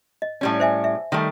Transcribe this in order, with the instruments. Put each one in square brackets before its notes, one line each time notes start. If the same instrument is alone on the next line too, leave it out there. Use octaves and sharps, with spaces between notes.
[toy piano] D#5
[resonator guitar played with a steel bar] A2 G3 C#4
[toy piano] C5 E5 G#5
E5
[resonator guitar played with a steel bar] D#3 G3 A3